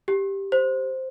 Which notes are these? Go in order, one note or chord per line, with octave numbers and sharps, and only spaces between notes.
G4
C5